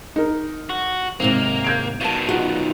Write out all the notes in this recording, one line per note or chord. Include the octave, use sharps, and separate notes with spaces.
D#4 A#4
F#4
D#2 G#2 C3 A#3 C4
G6 G#6 D7
B2 D#3 F5 A5
D#4 F4 F#4